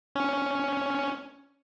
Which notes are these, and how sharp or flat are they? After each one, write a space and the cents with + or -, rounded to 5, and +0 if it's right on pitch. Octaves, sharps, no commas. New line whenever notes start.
C#4 +5